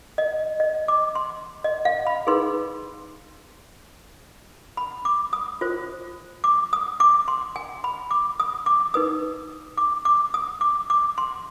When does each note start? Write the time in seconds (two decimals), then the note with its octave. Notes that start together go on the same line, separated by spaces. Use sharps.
0.18 D#5
0.60 D#5
0.88 D6
1.15 C6
1.64 D#5
1.85 F5
2.07 B5
2.27 D#4 G#4 B4 C6
4.77 B5
5.05 D6
5.33 D#6
5.61 F4 C5
6.44 D6
6.73 D#6
7.00 D6
7.28 C6
7.56 G#5
7.84 B5
8.11 D6
8.40 D#6
8.66 D6
8.94 D#4 B4 D#6
9.77 D6
10.05 D6
10.34 D#6
10.61 D6
10.90 D6
11.18 C6